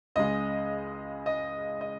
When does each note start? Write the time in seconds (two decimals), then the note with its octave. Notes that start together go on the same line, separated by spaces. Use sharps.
0.15 C#2 C#3 G#3 D#5
1.26 D#5
1.81 D#5